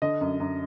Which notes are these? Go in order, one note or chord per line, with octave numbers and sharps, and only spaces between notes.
D3 D#5
F#2
F#2